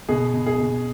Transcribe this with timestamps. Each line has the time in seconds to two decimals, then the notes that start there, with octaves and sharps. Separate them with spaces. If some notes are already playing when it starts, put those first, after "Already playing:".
0.09 B2 G#4
0.33 B2
0.46 G#4
0.58 B2